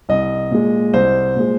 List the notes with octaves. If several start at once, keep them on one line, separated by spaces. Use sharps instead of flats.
C2 D#5
A#2 G#3
C2 C5
A#2 G#3